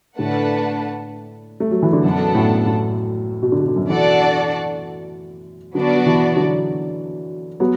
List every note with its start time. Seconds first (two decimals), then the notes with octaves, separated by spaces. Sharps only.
0.19 A2 D3 A3 D4 B4 F#5 A5
1.60 A3
1.71 F#3
1.83 E3
1.93 D3
2.04 F#2 B2 B3 D4 A4 F#5 A5
2.35 A2
2.66 A2
3.42 B2
3.52 D3
3.60 B2
3.68 D3
3.76 F#2 B2
3.89 B2 E3 D4 F#4 A4 D5 F#5
5.74 D3 F#3 B3 D4 F#4 D5
5.96 F#3
6.06 B2 E3
6.36 D3 F#3
7.60 F#3 B3